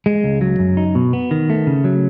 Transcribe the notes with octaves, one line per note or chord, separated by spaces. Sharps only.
G#3
C#2
F#3
F#2
D#4
B2
B3
D#3
A3
C#3
F#3